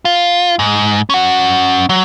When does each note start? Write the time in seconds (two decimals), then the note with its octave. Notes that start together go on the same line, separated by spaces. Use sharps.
0.05 F4
0.59 G#2
1.10 C#4 F#5
1.89 F#3